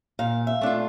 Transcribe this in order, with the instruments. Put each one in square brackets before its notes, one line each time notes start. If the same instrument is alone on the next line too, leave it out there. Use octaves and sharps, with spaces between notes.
[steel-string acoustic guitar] A#2 F5
E5
A3 D4 F4